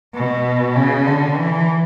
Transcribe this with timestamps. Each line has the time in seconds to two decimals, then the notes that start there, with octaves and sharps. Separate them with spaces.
0.14 B2
0.76 C#3
1.06 D3
1.36 E3